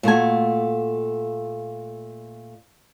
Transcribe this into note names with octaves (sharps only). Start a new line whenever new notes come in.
A#2 A3 F#4 G#5